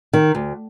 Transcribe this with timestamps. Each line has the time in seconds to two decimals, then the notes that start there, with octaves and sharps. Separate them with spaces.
0.13 D#3
0.35 D2